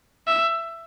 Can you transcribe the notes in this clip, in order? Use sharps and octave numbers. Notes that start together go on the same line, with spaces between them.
E5